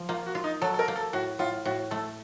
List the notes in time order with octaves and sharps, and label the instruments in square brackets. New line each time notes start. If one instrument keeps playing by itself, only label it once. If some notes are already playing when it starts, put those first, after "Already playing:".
Already playing: [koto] F3
[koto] A#3 [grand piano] F4
[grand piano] F#4
[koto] F4
[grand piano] D#4
[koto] F#3 [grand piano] A4
[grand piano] A4
A#4
[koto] A#3
[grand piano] A4
[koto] A2 [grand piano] F#4
[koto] A2 [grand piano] F4
[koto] A2 [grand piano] F#4
[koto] A3 [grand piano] A4